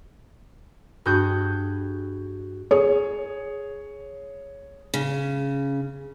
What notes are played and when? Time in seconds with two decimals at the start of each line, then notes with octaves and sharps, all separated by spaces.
1.05 G2 F#4 G#4 G6
2.71 G#4 C#5
4.94 C#3